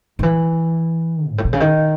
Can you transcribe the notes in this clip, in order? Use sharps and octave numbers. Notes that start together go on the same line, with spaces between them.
D#3
E3
G#2
A2
B2
C#3
D#3